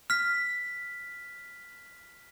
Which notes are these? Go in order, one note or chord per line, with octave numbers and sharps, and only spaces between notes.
F6 B6